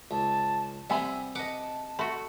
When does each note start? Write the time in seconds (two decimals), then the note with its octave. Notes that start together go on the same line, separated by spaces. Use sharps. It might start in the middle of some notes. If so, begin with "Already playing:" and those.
0.11 C#2 A5
0.90 C3 G3 B3 E5 G#5 B5 E6
1.35 B4 D#5 F#5 A5 D6
1.99 A3 F#4 B5